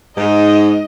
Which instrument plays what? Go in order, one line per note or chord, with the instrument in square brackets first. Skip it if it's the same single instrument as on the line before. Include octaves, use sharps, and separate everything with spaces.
[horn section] G#2 [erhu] D#5